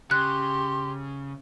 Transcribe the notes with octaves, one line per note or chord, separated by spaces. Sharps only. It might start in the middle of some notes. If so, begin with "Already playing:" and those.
C#3 G4 C6 F#6